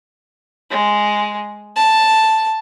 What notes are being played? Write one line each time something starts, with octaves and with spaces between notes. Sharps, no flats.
G#3
A5